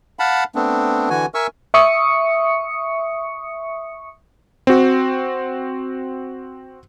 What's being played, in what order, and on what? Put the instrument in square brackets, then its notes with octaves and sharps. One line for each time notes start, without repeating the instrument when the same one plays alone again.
[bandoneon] F5 F#5 A5 B5
A3 B3 C4 D4
D3 E3 F#4 G#5
A#4 E5 G#5 C#6 E6
[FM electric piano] E5 C#6 D#6 C#7
[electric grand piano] C4 F#4